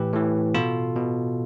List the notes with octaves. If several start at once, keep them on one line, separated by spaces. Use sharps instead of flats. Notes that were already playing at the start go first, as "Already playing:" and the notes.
Already playing: A2 E3 G4 B4
A2 E3
B2 F4 A4
B2